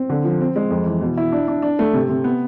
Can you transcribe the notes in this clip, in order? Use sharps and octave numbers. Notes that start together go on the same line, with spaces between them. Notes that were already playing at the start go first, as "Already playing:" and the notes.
Already playing: C4
D3
F3
C4
G#3
F2
E3
B2
E4
D4
D4
D4
A3
C3
C3
B3